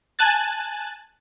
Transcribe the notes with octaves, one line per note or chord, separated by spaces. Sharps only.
G#5 A5 F#6 A6